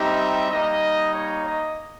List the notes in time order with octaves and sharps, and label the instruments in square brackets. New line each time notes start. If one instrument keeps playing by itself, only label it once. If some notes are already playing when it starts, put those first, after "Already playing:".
Already playing: [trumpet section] G3 C4 D#4 G4 E5
G3 A#3 D#4 D#5
C#5
D#5